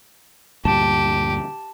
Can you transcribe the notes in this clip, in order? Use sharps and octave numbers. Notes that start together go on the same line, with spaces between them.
D2 G2 A#2 G4 A5